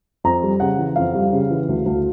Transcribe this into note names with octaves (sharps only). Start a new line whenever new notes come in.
F2 A#5
G3
C#3 F#5
E3
F2 F5
G3
C#3
E3
D2
D2